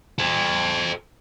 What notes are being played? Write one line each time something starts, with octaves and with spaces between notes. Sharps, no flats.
A4 C5